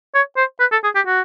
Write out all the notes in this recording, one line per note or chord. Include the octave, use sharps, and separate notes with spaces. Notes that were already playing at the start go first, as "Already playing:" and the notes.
C#5
C5
B4
A4
G#4
G4
F#4